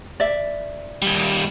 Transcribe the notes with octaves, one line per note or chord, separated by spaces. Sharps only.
D5 E5
D#2 G3